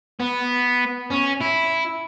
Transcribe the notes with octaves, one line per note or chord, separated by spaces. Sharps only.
B3
C#4
E4